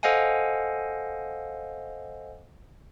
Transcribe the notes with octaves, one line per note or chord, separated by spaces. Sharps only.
A4 C5 D#5 F5 F#5 G#5